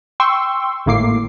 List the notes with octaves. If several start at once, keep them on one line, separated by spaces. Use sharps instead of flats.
G5 C6 C#6 E6
G#1 A2 A#3 D6 C7